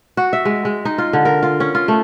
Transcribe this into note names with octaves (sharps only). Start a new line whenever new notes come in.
F#4
E5
G#3
G#3
D#4
F4
D3
A#4
F4
C#4
F4
A3